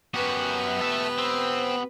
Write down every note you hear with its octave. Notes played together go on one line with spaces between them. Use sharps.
F#2 B3 F#4 G4 B4
A4 E5
C4